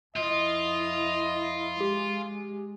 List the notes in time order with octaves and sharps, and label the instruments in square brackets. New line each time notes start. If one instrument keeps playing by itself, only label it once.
[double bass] F2 E4 [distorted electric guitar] F4 [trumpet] D#5
[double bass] G#3 [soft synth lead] G4